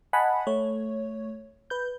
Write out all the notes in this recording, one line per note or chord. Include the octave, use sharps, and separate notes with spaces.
D#5 F#5 G#5 A5 B5
A3 C#5
B4 G6